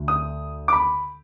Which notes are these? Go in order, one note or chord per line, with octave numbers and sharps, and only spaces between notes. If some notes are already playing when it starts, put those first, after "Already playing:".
Already playing: D2
D#6
D6
B5